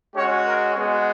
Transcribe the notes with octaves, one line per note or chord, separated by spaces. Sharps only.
G#3 C#4 F#4 C#5
A#4
G#3 B3 F#4 G#4